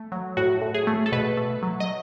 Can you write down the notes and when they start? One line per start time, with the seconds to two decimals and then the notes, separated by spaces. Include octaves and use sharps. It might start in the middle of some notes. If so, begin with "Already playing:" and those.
Already playing: A3
0.12 F#3
0.37 A2 F#4
0.62 A2
0.74 G#4
0.87 A3
1.06 A4
1.12 B2 B4
1.37 A3
1.63 F#3
1.80 D#5